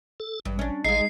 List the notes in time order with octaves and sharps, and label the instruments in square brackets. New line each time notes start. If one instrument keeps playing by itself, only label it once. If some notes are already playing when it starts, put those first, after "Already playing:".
[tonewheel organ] A4
[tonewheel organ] A1 [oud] G2
[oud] C#4 D4
[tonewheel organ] A1 G#4 F5 [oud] G#3 D#4 [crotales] C7